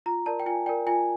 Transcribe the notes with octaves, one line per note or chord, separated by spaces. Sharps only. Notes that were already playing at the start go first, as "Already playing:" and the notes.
F4 A#5
A#4 D5 A5
G5
F4 G#5
A#4 D5 G5
F4 G#5